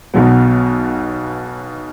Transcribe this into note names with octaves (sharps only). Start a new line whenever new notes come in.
B1 B2 F#3 B3